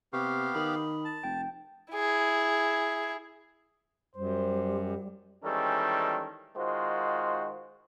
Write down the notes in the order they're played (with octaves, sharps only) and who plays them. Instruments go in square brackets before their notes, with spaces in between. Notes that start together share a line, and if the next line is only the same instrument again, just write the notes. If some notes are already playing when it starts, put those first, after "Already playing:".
[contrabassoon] C3 [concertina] B3 G4 F5 [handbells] C#6
[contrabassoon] D#3 [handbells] B5 D#6
[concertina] A5
[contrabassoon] F1 [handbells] G5
[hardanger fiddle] E4 G#4
[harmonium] F#2 [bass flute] G3 [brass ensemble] C5
[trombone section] D#3 E3 G3 G#3 C#4 A4
D#3 G#3 F4 F#4 C5